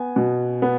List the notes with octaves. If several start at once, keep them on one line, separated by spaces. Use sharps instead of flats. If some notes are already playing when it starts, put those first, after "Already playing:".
Already playing: B3 G#5
B2
B3